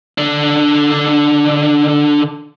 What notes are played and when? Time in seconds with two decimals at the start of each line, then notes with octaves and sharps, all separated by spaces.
0.18 D3 D4